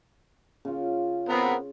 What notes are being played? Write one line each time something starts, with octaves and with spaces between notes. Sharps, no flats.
C#3 F4
B3 C4 A#4